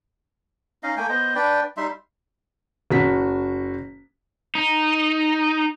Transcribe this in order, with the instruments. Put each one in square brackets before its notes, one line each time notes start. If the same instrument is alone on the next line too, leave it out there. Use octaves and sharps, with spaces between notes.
[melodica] C#4 D#4 D#5 F5
A3 A#3 G5 G#5
B3 C5 D#5
D4 B4 D5 G5
G3 D#4 E5 C6
[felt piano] F#1 F#4 B6
[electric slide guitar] D#4